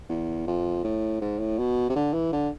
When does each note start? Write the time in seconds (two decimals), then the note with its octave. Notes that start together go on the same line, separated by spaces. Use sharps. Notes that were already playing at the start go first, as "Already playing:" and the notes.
0.10 E2
0.47 F2
0.84 A2
1.21 G#2
1.39 A2
1.58 B2
1.90 C3
1.96 D3
2.14 E3
2.33 D3